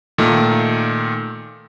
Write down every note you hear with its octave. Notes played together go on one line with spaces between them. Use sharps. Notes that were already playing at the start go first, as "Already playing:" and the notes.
A#2 D#3 A3